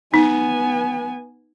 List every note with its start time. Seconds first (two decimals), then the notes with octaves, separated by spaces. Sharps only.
0.14 B3 D#4 G#5